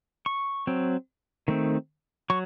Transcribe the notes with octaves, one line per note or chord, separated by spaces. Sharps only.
C#6
F#3 C4
D#3 A3 C4
F#3 C#6